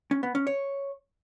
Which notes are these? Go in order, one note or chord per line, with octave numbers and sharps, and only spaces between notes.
C#4
B3
C#4
C#5